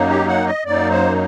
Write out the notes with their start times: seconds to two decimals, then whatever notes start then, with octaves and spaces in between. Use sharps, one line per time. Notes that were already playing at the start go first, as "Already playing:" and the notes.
Already playing: F#2 F#3 A#3 D#4
0.09 G4
0.28 F#5
0.47 D#5
0.65 F#2 F#3 A#3 D#4 D5
0.91 C5